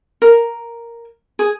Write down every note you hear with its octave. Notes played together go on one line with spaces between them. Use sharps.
A#4
G#4